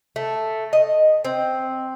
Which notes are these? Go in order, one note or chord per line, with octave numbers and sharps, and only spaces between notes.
A3
D#5
C4